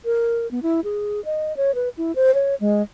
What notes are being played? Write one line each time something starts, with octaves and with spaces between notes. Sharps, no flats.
A#4
B3
E4
G#4
D#5
C#5
B4
E4
C5
C#5
G#3